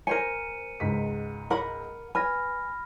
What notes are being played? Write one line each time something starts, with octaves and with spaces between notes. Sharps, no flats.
A#4 C5 G#5 C#7 D#7
C#2 G#2 B6
A#4 F#5 B5
B4 G#5 B5 F6 A#6